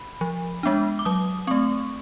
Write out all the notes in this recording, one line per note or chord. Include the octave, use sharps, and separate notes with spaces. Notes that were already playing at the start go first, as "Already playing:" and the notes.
Already playing: B5
F3
G#3 B3 D4
D6
F#3 D#6
A3 C4 C#6